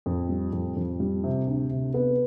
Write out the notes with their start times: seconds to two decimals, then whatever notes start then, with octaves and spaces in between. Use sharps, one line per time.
0.06 F2
0.29 G3
0.53 F2
0.76 F2
1.00 G3
1.24 C3
1.47 D2
1.70 C3
1.94 B3